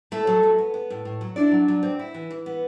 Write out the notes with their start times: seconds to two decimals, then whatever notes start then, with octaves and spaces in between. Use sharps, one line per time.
0.12 A3 E4 A4
0.27 F#3
0.43 F#3
0.58 B3
0.74 B3
0.90 A2
1.05 A2
1.21 F#3
1.36 D4 E4 D5
1.52 F#3
1.68 F#3
1.83 C4
1.99 E4
2.14 E3
2.31 E3
2.46 B3